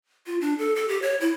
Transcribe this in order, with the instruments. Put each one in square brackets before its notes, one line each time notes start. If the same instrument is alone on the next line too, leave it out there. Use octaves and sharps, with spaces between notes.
[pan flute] F4
D4
A4
A4
G4
C#5
E4